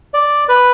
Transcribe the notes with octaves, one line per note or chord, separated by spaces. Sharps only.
D5
B4